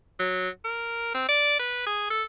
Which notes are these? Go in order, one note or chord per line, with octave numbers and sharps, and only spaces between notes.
F#3
A#4
C4
D5
B4
G#4
A4